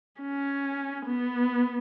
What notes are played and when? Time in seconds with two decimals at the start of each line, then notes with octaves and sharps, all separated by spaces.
0.21 C#4
1.06 B3